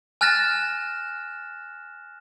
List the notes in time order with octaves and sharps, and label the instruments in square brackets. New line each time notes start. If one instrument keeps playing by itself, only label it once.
[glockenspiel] G#5 F6 F#6 A6 A#6 E7